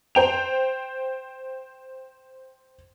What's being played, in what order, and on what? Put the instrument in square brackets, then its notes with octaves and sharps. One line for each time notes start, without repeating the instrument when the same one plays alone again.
[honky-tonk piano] C5 G5 F7